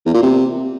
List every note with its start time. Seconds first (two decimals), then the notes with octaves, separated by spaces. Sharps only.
0.06 E2
0.14 A#2
0.23 C3